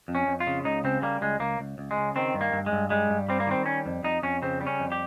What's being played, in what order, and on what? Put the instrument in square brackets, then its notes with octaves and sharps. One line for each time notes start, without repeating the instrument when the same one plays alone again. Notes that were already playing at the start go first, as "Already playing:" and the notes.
[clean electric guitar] F2
C#4
F2
F4
C#3
C#2 D#4
C#3 C4
G3 A#3
C#2 G#3
C#2 A#3
C#2
C#2
G#3
C#3
D#3 C4
G2
A#3
G2
G#3
G2
G3 G#3
G2
G3 C4
A#3
D#3 C4
G3 C#4
F2
F2 D#4
F2 C#4
C#3 C4
G3
C#4
F2
G4